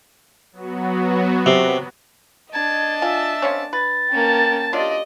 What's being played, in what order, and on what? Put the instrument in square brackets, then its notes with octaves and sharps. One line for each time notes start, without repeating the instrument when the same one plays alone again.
[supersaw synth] F#3 B3 F#4
[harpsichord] C3
[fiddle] D4 A5 [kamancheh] D#5 [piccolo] G#6
[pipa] F4 G#5 [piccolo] E5
[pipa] A#3 C4 C#4
[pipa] B4 [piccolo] A6
[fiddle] A#3 C#4 [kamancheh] G5 A5
[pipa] F#3 D4 F4 [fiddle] G4 D5 [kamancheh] D#5